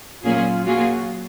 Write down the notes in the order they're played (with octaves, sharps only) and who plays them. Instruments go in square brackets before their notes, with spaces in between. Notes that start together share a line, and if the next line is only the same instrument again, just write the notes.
[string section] A#2 F#3 A#3 C#4 G#4 [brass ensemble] F4
[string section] F#3 A#3 F4 G#4 [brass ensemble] F#4